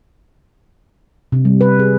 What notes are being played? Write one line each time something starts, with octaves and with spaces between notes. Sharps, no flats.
C3
G3
B4
G#4